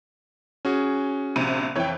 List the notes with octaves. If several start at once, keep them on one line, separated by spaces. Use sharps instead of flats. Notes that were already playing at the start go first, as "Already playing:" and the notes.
C#4 F#4 G#4
A#1 C3 D#7
F2 E3 C#5 G5